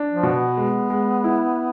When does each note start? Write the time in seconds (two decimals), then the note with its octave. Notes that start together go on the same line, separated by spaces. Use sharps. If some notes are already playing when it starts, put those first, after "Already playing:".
Already playing: D4
0.12 F3
0.23 B2
0.34 B3
0.57 G#3
0.90 G#3
1.24 E4